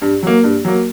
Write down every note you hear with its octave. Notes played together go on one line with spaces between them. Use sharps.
G2
F#3 A#3
G2
F#3 A#3